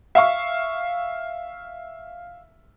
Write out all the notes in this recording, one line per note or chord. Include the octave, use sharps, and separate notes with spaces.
E5 F5 C#6